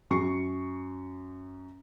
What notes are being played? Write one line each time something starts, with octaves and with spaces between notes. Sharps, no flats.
F#2 C#6 C7 C#7